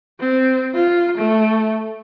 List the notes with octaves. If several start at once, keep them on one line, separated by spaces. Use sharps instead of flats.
C4
F4
A3